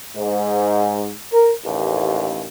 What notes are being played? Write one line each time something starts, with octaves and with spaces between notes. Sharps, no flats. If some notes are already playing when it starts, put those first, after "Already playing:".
G#2
A#4
A1 D#2